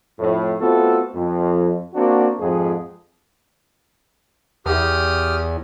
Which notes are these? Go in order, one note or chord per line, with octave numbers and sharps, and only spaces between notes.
F2 A2
A3 B3 C4 F4 F#4 A4
F2
A#3 C4 D4 F#4
F2 G#2 G#4
E2 G4 D#6 F6